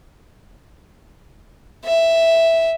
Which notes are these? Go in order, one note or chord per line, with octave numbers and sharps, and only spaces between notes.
E5